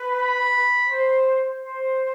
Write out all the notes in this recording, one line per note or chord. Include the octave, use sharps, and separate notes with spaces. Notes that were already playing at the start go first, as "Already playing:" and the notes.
Already playing: B4
B5
C5
C5